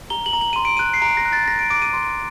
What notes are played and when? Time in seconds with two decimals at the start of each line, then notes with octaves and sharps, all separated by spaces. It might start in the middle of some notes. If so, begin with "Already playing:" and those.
0.10 A#5 G7
0.26 F#7
0.33 A#5
0.41 F#7
0.53 C6 D#7
0.65 D7
0.77 F#6 D#7
0.94 C7
1.02 A#5 D7
1.17 A#6
1.25 F#6
1.33 A6
1.48 A#5 A#6
1.59 D7
1.70 D6 D7
1.82 D#7
1.93 C6